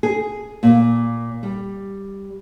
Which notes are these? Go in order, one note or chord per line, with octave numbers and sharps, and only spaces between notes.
G#4
A#2
G3